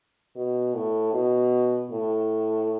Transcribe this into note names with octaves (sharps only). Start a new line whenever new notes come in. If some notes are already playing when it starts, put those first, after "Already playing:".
B2
A2
B2
A2